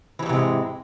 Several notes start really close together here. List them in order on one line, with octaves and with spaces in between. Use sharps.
E3 F2 G#2 C3 G#3